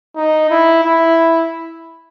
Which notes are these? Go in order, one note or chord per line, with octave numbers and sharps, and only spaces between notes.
D#4
E4
E4